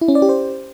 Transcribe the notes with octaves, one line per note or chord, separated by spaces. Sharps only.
E4
C#4
D5
G4
C5